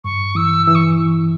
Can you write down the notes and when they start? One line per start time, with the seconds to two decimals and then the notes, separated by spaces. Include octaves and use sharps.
0.04 G2 C#6
0.35 E3 E6
0.66 E3 E6
0.75 C#6